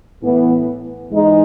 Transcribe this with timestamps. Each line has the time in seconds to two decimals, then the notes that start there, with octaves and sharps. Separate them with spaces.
0.23 A2 E3 B3
1.11 G#2 E3 G#3 D#4